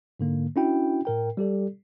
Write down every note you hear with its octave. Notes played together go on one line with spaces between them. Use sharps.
G#2 D3 A#3
C#4 D4 E4 F#4 G5
A2 A#4 G5
G3 G4 A4 D5